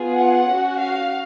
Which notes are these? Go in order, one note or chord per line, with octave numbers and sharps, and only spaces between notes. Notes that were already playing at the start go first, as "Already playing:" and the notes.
Already playing: B3 F4 G#4
F#5
C#4 F#4
F5